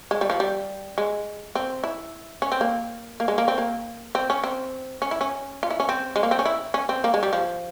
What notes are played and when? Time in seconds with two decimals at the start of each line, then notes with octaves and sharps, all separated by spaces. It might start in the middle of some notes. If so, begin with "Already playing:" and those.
0.11 G#3
0.21 G3
0.30 F3
0.40 G3
0.98 G#3
1.55 C4
1.84 E4
2.42 C#4
2.52 C4
2.61 A#3
3.20 A#3
3.28 G#3
3.38 A#3
3.48 C4
3.58 A#3
4.15 C4
4.30 C#4
4.44 C4
5.02 C#4
5.11 E4
5.21 C#4
5.63 F4
5.71 E4
5.80 C#4
5.89 C4
6.16 G#3
6.23 A#3
6.31 C4
6.39 C#4
6.45 E4
6.74 C#4
6.89 C4
7.04 A#3
7.14 G#3
7.23 G3
7.33 F3